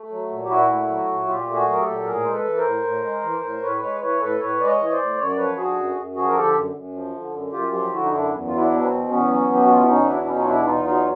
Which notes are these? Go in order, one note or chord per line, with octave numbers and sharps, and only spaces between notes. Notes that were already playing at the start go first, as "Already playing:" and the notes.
Already playing: A3
F#3
A#2
G4
A#2 E4 F#4
A3
F#3
A#2
A#2 F4 G4
A3
F#4 G#4
F#3
A#4
G4 A4
A#2
A2 G#4 A#4
G#3 C5
A4 B4
E3
A#4 C5
A2
A2
G#3
E3
A2
A2 B4 C#5
G#3 B4 C#5
E3 B4 C#5
A2 A4 B4
A2 B4 C#5
G#3 D5
C#5 D#5
E3
C#5
C5 D5
A2
F#2 C#5
D5
F3 B4 C#5
D3 F#4 G#4
F#2
F#2
F3 F#4 G#4
A#4
D3 G4 A4
F#2
F#2
F3
D3
F#2
F#2 F4 G4
F3 F4 G4
D3 E4 F#4
D#4
F#2 D4 E4
E2
F#3 F4
D4 E4
B2
C4
E2
E2 B3 C#4
F#3
B2
G4
F#4
E2 F4
E4
E2 C#4 D#4
F#3 D4 E4
D4
B2 C#4 D#4
F4
E2 D4 E4
E2 D#4 F4
F#3 D#4 F4